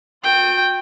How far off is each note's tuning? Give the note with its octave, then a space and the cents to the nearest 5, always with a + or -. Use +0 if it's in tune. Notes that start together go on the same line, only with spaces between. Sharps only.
F#4 -35 G5 +0